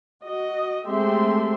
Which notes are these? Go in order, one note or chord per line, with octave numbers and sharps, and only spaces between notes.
F#4 D#5
G#3 A3 C4 G4 E5 C6